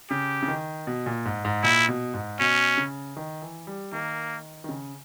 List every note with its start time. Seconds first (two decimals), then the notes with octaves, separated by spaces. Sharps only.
0.10 C#3 G4
0.42 C#3
0.48 D#3
0.87 B2
1.06 A#2
1.25 G#2
1.45 G#2
1.63 A#2 E4
1.88 B2
2.14 G#2
2.40 B2 C#4
2.77 C#3
3.17 D#3
3.42 E3
3.67 G3
3.92 D#3 A#3
4.64 D#3
4.69 C#3